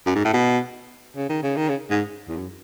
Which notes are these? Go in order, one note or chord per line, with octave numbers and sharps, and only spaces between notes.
F#2
G#2
A2
B2
C#3
D#3
C#3
D#3
C#3
G#2
E2
F#2